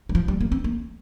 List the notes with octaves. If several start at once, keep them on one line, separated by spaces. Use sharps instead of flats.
G3
F3
G3
A#3
C4
A#3